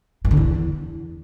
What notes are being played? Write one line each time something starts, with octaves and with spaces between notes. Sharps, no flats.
G2
D3
E2